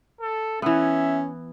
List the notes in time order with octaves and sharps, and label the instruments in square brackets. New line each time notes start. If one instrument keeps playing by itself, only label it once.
[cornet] A4
[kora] E3 B3 [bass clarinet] C#4 [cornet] E5